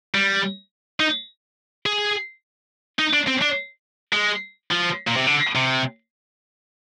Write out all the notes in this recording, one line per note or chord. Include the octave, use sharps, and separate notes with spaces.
G3
D#4
G#4
D#4
D4
C4
D4
G#3
F3
A#2
C3
D3
C3